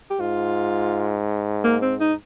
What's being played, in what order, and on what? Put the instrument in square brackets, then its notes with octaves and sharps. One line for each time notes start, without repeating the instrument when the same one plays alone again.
[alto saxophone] G4
[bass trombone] G#2 [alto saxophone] F4
[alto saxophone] A#3
C4
D#4